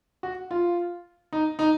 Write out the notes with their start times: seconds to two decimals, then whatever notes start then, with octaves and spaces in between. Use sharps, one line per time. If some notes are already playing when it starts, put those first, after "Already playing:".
0.23 F#4
0.51 F4
1.33 D#4
1.59 D#4